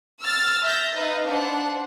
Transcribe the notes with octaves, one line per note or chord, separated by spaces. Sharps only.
E6 F6 A6
E5 G6 A#6
D#4 B4 D#5 F5
D4 C5 F#5